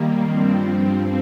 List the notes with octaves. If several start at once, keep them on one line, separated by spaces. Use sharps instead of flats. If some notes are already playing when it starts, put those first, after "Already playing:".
Already playing: D#3 G3 A#3
G2 F3 C4